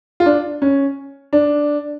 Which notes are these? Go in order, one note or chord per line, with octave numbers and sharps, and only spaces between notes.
F4
D4
C#4
D4